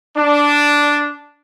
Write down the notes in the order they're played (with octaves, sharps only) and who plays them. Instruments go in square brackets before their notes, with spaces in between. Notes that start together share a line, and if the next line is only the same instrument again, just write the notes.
[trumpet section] D4